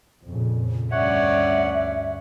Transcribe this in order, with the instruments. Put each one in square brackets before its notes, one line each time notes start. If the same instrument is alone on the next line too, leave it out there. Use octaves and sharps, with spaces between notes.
[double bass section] F2 A#2 C#3
[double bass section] D2 G2 [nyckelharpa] C#4 D5 [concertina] C#5 F#5 [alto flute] E5